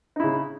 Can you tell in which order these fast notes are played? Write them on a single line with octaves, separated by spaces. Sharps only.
D#4 E4 C#3